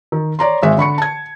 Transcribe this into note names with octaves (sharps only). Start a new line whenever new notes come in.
D#3
C#5 D5 A#5 C6
G#1 G#3 E5
D3 B5 C#6 C#7
A5 G#6